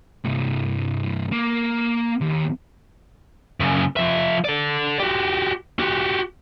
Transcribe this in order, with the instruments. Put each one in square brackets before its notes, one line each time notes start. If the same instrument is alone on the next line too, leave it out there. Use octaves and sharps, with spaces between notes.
[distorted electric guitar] C2 G2
A#3
D#2
[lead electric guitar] F#2 C#3
F3 E5
A4 D5
F#4 G4
F#4 G4